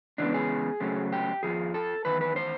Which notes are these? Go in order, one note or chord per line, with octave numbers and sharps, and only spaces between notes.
C#3 E3 G#3 B3 D4
G#4
C#3 F#3 A3 C4
G4
F2 C3 F3 G#4
A4
E2 C3 D#3 B4
B4
C5